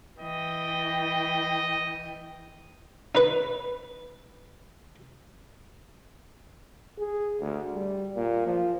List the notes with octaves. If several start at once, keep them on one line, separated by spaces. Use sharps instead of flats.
E3 D#5 G5
D#4 B4
G#4
D2
G3
A#2
F3